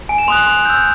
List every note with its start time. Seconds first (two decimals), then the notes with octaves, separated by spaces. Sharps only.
0.09 G#5 D7
0.18 E7
0.28 C6 D#6 F#6 F7
0.37 F#7
0.46 C6 F7
0.65 E6 G6